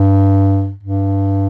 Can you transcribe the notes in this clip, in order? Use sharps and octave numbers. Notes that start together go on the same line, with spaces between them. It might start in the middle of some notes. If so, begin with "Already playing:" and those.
Already playing: G2
G2